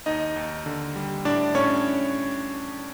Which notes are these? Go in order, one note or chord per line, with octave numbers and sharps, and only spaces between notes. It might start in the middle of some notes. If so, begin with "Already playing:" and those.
D#2 D#4 D#5
D#2
D3
G3
A2 D4 D5
A2 C#4 C#5